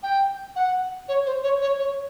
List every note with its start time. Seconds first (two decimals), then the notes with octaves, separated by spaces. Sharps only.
0.03 G5
0.56 F#5
1.08 C#5
1.26 C5
1.43 C#5
1.62 C#5
1.79 C#5